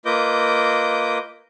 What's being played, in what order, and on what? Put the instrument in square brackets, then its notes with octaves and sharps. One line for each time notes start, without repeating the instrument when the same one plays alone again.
[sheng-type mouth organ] A#3 F4 B4 D#5 D6 G6